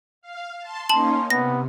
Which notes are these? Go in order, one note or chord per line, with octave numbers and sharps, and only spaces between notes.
F5
A5 C6
A#3 C#4 D#4 A5 C6 F#7
C3 B3 A#6